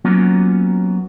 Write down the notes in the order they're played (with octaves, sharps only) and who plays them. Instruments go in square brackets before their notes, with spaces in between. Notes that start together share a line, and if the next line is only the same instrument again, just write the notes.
[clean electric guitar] F#3 A#3 B3 C#4 F4 F#4